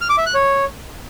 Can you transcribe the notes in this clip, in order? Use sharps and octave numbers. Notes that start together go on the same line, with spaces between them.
F6
D6
E5
F#6
C#5